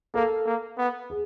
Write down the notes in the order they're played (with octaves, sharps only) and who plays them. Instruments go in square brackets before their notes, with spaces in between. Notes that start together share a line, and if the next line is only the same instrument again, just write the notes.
[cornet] A#3 [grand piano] A4
[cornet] A#3
B3
[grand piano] G#4